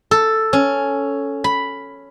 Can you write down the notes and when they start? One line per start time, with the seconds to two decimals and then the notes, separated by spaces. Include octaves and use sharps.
0.11 A4
0.53 C#4
1.44 B5